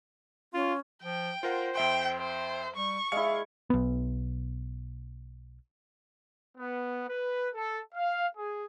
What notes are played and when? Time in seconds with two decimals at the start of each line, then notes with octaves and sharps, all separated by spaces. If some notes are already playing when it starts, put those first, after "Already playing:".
0.54 C#4 F4
1.03 F3 G5
1.43 F4 A#4 C5 F#5
1.76 F2 E5 G5 C6
2.19 C5 G5
2.76 G3 C#6
3.12 G#3 E4 D5 E5 F5 C#7
3.70 B1 B3
6.57 B3
7.08 B4
7.55 A4
7.95 F5
8.36 G#4